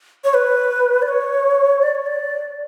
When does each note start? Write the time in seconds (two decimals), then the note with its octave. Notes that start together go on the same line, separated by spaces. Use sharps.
0.24 C#5
0.34 B4
1.02 D5
1.08 C#5
1.83 D5
1.95 C#5
2.06 D5